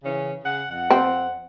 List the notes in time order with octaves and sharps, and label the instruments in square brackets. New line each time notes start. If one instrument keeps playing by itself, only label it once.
[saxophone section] C#3 E3 C#4
C#3 F#5
F2 F#5
[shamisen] C4